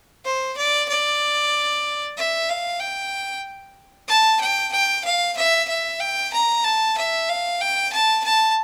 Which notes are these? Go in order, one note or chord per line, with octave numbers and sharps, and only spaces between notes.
C5
D5
D5
E5
F5
G5
A5
G5
G5
F5
E5
E5
G5
A#5
A5
E5
F5
G5
A5
A5